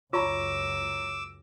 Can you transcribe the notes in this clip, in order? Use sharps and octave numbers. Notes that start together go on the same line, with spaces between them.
C#2 F#2 F4 C#5 A#5 C#6 D6 E6